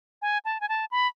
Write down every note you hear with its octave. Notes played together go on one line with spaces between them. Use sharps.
G#5
A5
G#5
A5
B5